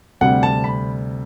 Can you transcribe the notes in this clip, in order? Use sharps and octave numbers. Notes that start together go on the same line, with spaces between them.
D2 C3 G3 F#5
A5
B5